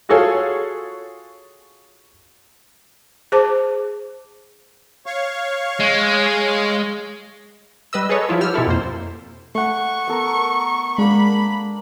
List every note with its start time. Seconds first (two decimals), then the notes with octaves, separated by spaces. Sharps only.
0.09 F4 F#4 G#4 A4 C#5 F5
3.32 G#4 C5 A5 D6
5.06 C#5 F5 C#6
5.80 G#3
7.93 G3 B4 D#5 E6
8.09 G#4 A4 B4 C#5 D#5
8.29 F3 F#3 E4 F4
8.41 G4 E6 F6
8.54 B2 C4 E4 A4
8.67 F2 A#3 C5
9.55 A3 F#5 C#6
10.08 B3 A4 A#4
10.98 G#3 A#3 D4 B5